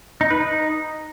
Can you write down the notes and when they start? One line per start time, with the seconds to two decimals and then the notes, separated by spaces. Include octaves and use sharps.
0.21 D#4
0.31 B4
0.40 D#4